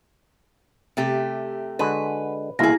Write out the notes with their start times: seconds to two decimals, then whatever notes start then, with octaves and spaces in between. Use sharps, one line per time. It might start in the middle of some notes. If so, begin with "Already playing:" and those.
0.97 C3 A3 G4
1.79 D3 G#3 F#4 B4
2.59 C2 B2 E3 A#3 E4 G#4 A#6